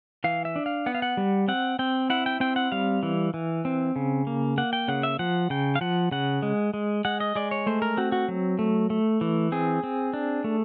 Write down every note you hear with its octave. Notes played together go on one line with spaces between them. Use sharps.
E3 F5
E5
D4
F5
B3 F#5
F5
F#5
G3
C4 F#5
C4 G5
E4 F#5
G5
C4 G5
F#5
G3 F5
E3
E3
C4
C#3
A#3
A#3 F#5
G5
C#3 F#5
E5
F3 F#5
C#3 G5
F5
F3 F#5
C#3 F#5
G#3
G#3
G#3 F#5
D#5
G#3 D5
C#5
A3 C5
A#4
C4 F#4
F#4
F#3
A3
A3
E3
C4 G#4
C4
D4
A3